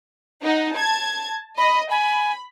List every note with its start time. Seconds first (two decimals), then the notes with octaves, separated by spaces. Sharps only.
0.43 D#4 F#5
0.73 A5 G#6
1.58 D#5 B5
1.91 G#5 B5